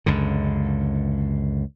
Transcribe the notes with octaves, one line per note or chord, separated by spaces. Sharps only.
C#2 F#2 D3